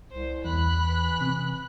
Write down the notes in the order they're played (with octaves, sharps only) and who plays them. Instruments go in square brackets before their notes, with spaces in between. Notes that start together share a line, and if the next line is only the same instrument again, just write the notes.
[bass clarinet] C2 [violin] C5
[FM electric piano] E2 [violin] B5 F#6
[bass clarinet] E3
[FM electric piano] C3